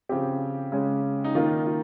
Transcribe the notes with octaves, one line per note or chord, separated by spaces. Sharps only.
C#3 F3 C4 G4
C#3 G#3 C#4
D#4
D#3 A#3 D#4 F4
F4